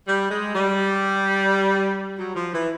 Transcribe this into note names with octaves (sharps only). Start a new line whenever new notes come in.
G3
G#3
G3
F#3
F3
E3